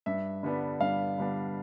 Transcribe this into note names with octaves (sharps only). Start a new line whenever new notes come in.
G2 E5
D3 G3 B3 D4
G2 F5
D3 G3 B3 D4